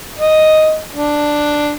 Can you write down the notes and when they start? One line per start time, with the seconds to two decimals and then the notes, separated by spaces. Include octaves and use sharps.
0.19 D#5
0.93 D4